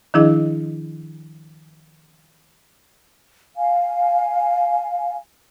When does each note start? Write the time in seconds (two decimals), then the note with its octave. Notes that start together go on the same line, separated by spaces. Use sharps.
0.14 D#3 F3 D4 E4 G#4 D#5
3.56 F5 G#5